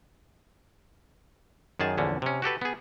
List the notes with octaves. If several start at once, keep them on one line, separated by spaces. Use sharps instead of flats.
F#2 D#3 G#4 A5
A#1 E2 D3 C#4
C3 C#4
F#4 G4 A4 B4
B3 G#4